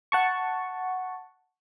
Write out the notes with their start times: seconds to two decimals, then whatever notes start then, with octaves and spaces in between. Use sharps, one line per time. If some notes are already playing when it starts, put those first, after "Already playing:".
0.12 F#5 A5 C#6